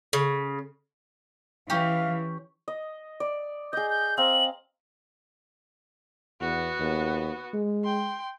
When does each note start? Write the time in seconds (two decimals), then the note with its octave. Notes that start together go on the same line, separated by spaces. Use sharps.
0.13 C#3
1.70 E3 C#4 G4 F5
2.68 D#5
3.20 D5
3.73 G#4 D#5 G6
3.90 G6
4.18 C4 F5 A#5 F#7
6.41 E2 B3 F#4
6.80 D#2
7.53 G#3
7.84 G5 C6